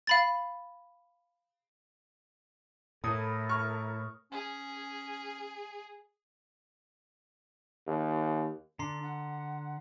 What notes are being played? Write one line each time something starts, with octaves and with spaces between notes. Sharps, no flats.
F5 B5 A6
A2 E4 A4 A#4 D#6
C#6 F6
C#4 G#4
D#2
D3 D4 A#5 C6 C7
F#5